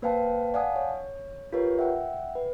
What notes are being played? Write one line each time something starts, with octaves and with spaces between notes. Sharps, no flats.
A#3 B4 C5 F5 G5 A5
D5 F5 F#5 G#5 A5 D#6
C#5
F4 G4 A#4 B4 C#5
E5 F#5 G5
B4